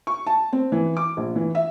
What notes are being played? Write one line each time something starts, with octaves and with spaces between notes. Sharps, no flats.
C#6
A5
C4
E3
D6
A#1
E3
E5